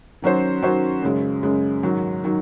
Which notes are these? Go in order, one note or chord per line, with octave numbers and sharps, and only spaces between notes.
D#3 F#3 C#4 F#4 C5
D#3 F#3 C#4 F#4 C5
F#2 C#3 G#3
F#2 C#3 G#3
G#2 D#3 F#3
D#3 F#3